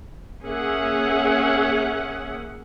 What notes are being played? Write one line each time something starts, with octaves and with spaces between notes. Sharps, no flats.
A#3 C#4 G#4 E5 F#5